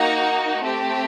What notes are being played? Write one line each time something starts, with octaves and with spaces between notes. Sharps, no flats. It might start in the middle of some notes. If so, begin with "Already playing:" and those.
Already playing: A#3 D#4 F#4 A#5
A3 C4 G4